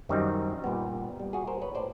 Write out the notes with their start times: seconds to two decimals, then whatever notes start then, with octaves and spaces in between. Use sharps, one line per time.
0.09 F#2 D#3 G3 C4 D#4
0.64 A#2 G3 B3
1.20 A#2 G3 B3
1.33 F#4 G#4
1.47 A#4 C5
1.62 B4 C#5
1.75 A2 C5 D5